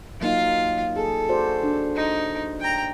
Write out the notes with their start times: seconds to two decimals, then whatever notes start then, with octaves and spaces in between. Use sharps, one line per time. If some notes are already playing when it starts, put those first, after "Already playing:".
0.21 F#3 A#3 D#4 F4 F5
0.96 G#4 A4
1.29 F#4 C5 D5
1.63 D4
1.96 D#4
2.60 G5 A#5